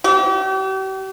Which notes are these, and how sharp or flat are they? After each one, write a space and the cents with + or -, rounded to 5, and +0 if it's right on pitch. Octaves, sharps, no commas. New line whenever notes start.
G4 -40